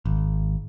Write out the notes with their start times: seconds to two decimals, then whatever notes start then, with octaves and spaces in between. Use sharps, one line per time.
0.05 G#1